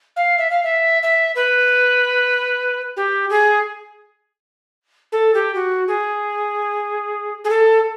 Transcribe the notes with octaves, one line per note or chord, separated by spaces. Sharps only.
F5
E5
F5
E5
E5
B4
G4
G#4
A4
G4
F#4
G#4
G#4
A4